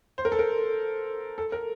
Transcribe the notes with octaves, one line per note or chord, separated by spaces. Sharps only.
C5
A#4
A4
A#4
A4
A#4